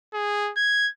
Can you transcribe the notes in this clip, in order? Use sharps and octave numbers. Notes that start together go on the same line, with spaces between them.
G#4
G#6